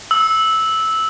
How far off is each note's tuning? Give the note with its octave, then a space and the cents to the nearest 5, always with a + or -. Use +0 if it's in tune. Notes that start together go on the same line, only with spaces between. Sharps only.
E6 -10